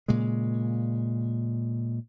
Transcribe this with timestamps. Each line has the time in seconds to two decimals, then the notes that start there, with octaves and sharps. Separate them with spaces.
0.08 A#2 C#3 G#3